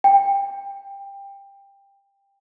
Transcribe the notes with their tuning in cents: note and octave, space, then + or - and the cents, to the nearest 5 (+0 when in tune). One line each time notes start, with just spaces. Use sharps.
G5 +20